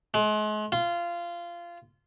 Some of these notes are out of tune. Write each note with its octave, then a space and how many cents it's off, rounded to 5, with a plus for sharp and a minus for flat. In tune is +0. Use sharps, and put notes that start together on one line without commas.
G#3 +40
F4 -20